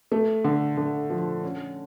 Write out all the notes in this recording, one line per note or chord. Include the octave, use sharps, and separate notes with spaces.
A3
D3
D3
F3
C#4